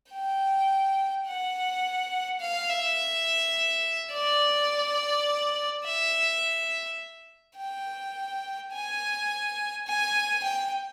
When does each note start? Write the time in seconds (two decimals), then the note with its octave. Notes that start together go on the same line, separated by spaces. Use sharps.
0.11 G5
1.26 F#5
2.41 F5
2.70 E5
4.13 D5
5.85 E5
7.57 G5
8.72 G#5
9.87 G#5
10.44 G5